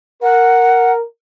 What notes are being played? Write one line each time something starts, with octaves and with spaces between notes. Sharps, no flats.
A#4 F#5